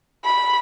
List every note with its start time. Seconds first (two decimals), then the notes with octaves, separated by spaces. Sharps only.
0.24 B5